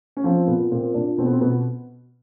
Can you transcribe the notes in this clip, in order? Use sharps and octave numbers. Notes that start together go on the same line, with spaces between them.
C#4
F3 C4
A#2 B3
A#2 C4
A#2 D4
B2 C4
B3
C4
B2 B3